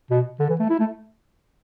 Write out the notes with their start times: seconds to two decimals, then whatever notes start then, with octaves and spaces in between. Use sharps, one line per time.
0.11 B2
0.40 D3
0.50 E3
0.60 A3
0.70 E4
0.79 A3